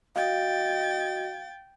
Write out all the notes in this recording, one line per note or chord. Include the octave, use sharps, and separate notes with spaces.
F#4 D#5 F5 G5 A6